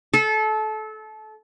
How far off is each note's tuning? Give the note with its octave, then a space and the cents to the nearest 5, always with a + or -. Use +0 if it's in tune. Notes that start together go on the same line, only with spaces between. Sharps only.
A4 -25